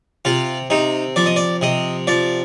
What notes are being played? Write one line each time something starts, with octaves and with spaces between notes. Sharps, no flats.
C3 F4
C3 D#4
F3 D5
D#5
D5
C3 D#5
F3 D5